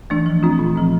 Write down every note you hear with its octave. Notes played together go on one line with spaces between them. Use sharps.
E3 A3 D4
F3
A3 C4 F4
A#2
F3 C4